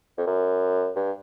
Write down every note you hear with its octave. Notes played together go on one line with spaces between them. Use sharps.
F2
F#2
G2